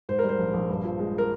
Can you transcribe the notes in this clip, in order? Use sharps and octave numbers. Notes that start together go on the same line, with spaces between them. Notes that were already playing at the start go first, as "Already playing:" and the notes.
G#2 C5
A#4
G3
C5
A#1
A#1
G2
F3
G#3
A#4